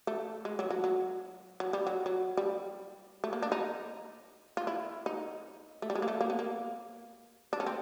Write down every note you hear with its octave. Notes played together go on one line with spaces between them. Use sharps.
A3
G#3
F#3
F#3
F#3
F#3
G3
F#3
F#3
G3
A3
A#3
D4
D#4
F4
E4
D#4
A3
G3
G#3
A#3
A3
A#3
B3
A#3
D4
C#4
C4